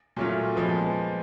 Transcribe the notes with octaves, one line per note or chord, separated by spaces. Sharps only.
A#2 F#3 A3 C#4 F4
A#2 F3 G#3 B3